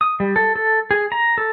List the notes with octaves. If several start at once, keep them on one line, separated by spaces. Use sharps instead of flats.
D#6
G3
A4
A4
G#4
A#5
A4